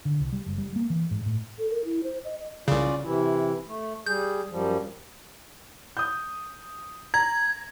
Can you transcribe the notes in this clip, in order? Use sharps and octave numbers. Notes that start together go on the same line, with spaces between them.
D3
C2
G3
F#1
G3
A#3
E3
G#2
A2
A4
A#4
E4
C5
D#5
D#5
C2 C#3 C#4 F4 D5
C3 E3 E4
A3
G3 G#4 G6
F#2 F3 G3
D#6 G6
A#5 G#6